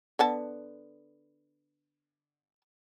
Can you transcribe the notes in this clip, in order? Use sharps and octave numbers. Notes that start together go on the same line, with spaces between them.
D3 B3 A5